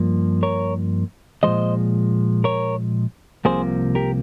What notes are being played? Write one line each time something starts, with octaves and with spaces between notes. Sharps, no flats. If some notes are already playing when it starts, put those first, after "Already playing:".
Already playing: G2 F3 A#3
A#4 C#5
A#2 F3 G#3 C5 D#5
A#4 C#5
C2 C3 F3 A#3 G#4 C5
G4 A#4